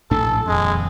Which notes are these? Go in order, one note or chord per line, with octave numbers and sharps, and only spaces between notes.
A#1 A2 D4 A4
D#1 F2 G#3